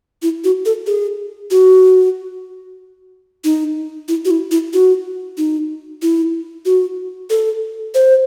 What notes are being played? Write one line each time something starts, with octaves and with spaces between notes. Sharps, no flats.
E4
F#4
A4
G#4
F#4
D#4
E4
F#4
E4
E4
F#4
D#4
E4
F#4
A4
C5